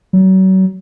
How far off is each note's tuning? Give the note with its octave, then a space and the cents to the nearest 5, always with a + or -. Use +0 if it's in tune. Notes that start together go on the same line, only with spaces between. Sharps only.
F#3 +35